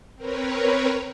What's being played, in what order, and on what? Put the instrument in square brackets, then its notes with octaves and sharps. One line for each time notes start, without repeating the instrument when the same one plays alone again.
[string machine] C4 A#4 B4 C#5